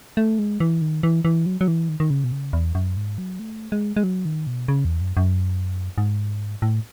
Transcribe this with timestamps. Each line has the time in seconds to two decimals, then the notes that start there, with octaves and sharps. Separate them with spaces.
0.17 A3
0.39 G#3
0.60 E3
0.81 D#3
1.03 E3
1.25 E3
1.46 F#3
1.61 F#3
1.68 E3
1.89 D#3
2.00 D#3
2.10 C#3
2.24 B2
2.32 C#3
2.53 E2
2.75 F#2
2.97 G#2
3.18 F#3
3.39 A3
3.72 G#3
3.97 G#3
4.03 F#3
4.25 D#3
4.47 B2
4.68 C#3
4.85 E2
5.01 F#2
5.17 F#2
5.98 G#2
6.62 A2